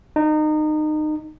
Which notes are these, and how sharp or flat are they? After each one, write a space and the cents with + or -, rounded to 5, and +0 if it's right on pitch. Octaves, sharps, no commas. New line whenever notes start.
D#4 -25